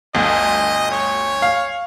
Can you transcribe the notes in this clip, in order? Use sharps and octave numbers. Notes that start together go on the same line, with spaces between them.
G1 D2 D#5
C#5
F5